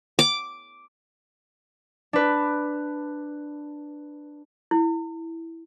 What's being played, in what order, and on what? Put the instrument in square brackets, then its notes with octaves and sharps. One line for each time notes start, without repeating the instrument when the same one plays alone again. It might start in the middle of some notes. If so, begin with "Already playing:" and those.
[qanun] D6
[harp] D4 B4
[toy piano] E4